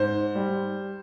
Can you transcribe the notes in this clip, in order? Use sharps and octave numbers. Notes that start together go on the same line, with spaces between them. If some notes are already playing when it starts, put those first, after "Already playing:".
Already playing: G#2 C5
G3